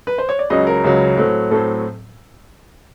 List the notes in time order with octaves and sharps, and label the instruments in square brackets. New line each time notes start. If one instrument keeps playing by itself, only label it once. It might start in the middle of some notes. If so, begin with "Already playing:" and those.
[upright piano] B4
C5
C#5
D5
C#2 C#3 F#3 D#5
A#4
C#2 C#3 F#3
A2 F#3 A3 C4
A2 F#3 A3 C4 A4